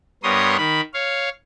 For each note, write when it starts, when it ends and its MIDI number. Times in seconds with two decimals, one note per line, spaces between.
0.23 0.57 43
0.23 0.57 59
0.23 0.57 70
0.23 0.57 73
0.23 0.57 84
0.23 0.57 87
0.58 0.81 51
0.58 0.81 83
0.93 1.29 73
0.93 1.29 77